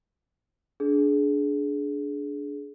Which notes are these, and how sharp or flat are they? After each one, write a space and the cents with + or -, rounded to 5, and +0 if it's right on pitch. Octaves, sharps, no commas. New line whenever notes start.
D4 -15 G#4 +20